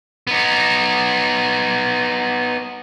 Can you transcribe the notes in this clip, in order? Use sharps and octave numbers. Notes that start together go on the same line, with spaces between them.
B3 D#4